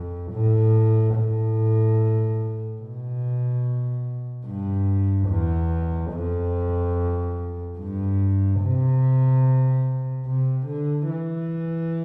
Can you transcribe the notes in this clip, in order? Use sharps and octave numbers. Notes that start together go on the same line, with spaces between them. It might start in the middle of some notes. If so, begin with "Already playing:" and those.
Already playing: F2
A2
A2
B2
G2
E2
F2
G2
C3
C3
D3
E3